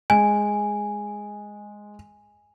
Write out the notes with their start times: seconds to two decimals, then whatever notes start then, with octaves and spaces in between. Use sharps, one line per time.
0.10 G#3 G#5